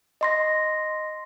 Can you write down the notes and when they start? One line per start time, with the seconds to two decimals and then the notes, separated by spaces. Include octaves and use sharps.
0.21 D#5 C6 A#6